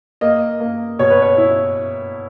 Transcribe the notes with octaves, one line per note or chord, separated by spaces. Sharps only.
A#3 D#5
A#3
B2 C#5
B4
C#5
E4